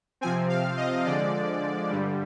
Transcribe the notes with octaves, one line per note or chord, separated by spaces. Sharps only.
C3 F3 C4 G#5
F5
D#5
D3 F3 G#3 D5
G2 D3 G3